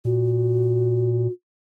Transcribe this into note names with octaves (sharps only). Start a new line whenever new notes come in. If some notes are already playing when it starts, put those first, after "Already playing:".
A#2 F#4